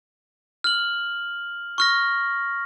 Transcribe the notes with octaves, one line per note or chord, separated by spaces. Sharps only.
F6 F#7
C#6 F6 A#6